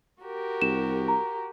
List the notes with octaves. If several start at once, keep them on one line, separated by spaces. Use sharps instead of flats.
F#4 G4 A#4
C2 E7
A#5